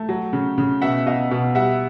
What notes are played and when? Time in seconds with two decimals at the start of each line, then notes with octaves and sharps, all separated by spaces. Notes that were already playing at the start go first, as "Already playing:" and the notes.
Already playing: A3
0.09 F#3
0.33 C#3
0.58 C#3
0.82 B2 E5 F#5
1.06 B2 D#5 F5
1.31 B2
1.55 G3 E5 F#5